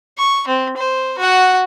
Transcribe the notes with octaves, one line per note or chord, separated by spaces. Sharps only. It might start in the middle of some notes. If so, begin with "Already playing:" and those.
C#6
C4
C5
F#4 F#5